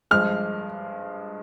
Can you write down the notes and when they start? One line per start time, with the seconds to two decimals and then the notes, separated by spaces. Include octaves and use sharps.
0.11 G2 F3 G#3 F6